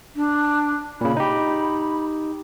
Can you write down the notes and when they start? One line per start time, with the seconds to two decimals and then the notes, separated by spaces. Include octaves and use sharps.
0.16 D4
1.01 A#2 C#3 B5
1.17 D#4 G4